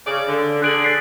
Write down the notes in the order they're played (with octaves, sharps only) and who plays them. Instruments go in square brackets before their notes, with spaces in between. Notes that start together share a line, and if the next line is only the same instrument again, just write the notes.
[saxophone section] C#3 D5
D3
[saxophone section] D3 G#4 [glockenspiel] F#6 D7 F#7
[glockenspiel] A6 B6 C7